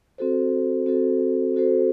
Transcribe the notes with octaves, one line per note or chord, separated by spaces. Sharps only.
C4 F#4 A4 C5
C4 F#4 A4 C5
C4 F#4 A4 C5